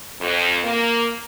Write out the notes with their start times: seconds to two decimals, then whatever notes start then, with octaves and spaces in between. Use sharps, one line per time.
0.21 F2
0.63 A#3